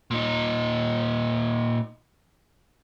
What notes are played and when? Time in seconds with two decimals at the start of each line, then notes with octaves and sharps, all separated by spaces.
0.11 A#2 D#4